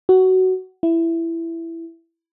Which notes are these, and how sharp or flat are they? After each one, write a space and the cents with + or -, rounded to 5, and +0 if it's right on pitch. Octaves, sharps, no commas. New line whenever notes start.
F#4 +15
E4 +10